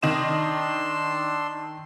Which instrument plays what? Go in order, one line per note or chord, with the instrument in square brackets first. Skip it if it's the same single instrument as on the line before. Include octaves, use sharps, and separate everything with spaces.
[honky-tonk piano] D#3 D#5 E7 [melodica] D4 C6 E6